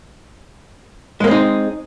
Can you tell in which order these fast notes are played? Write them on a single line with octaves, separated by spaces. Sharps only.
G#3 A#3 C4 D#4